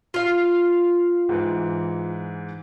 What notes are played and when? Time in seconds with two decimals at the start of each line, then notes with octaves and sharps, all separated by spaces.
0.14 F4 F5
1.29 G#2 E3